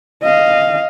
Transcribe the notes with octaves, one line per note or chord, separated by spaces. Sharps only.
D#5 F5